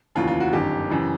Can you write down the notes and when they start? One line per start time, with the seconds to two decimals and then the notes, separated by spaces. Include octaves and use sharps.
0.15 F1 D#2 C#3 E3 F4
0.28 F4
0.40 F#4
0.53 G1 F#2 D#3 G4
0.90 F#2 C#3 E3